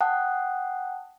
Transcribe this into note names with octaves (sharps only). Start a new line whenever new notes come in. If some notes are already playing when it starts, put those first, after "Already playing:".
F#5 G5 A5 D#6 F#6